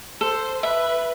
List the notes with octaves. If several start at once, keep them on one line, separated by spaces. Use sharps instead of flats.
A4 C5
B4 E5